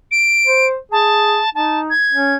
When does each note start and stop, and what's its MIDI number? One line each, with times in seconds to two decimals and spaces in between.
0.11 0.67 98
0.47 0.76 72
0.92 1.39 68
0.92 1.50 81
1.55 1.91 63
1.55 1.79 81
1.90 2.36 92
2.13 2.36 61